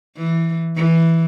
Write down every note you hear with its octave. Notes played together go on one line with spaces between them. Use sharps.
E3
E3